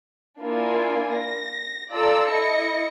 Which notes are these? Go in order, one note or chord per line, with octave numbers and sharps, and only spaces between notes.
A#3 D4 E4 F4 D5 G#5
A#6
F4 A4 D5 A#5 E6
E4 D#5 A#6 C#7